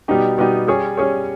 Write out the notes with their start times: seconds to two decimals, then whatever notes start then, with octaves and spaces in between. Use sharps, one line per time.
0.08 B2 G3 B3 D#4 G4
0.38 B2 G3 B3 D#4 G4
0.67 G3 C#4 G#4 C#5
0.97 G3 C#4 G#4 C#5